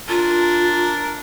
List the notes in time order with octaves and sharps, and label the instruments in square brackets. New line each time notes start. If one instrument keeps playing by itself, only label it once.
[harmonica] D4 A#4 [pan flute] F4